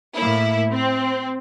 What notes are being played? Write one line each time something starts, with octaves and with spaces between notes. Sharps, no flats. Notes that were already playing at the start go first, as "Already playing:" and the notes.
A2 A#3 E4
C4